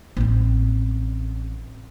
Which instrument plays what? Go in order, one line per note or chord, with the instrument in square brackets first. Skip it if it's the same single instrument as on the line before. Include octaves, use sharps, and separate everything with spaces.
[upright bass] A1 C4